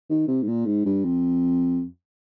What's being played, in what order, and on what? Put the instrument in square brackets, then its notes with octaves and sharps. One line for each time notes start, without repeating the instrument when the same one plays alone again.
[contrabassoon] D#3
C3
G#2
A#2
G#2
G2
F2